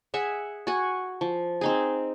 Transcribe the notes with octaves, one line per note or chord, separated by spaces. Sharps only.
G#4 E5 F#5
F#4 F#5 G#5
F3
C4 D#4 G#4